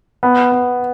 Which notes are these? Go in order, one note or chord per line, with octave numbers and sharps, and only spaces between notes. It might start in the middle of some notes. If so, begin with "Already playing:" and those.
B3
B3